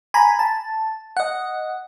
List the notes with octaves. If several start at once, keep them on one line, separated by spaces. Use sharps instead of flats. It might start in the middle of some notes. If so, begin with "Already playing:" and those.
G#5 A#5 B5
A5
D#5 F#5